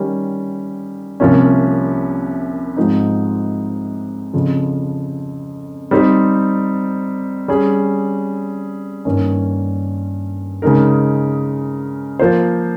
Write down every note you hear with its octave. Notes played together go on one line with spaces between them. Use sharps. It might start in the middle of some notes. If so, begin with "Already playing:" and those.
Already playing: D#3 G3 C#4 G4
C2 C3 F3 A#3 C#4
G#2 F3 C4 D#4
F2 C#3 F3
G3 C4 D#4 G4 C5
G3 C#4 G#4
G2 D#3 A#3 C#4
C#3 G#3 D#4 A#4
F3 A#3 F4 C5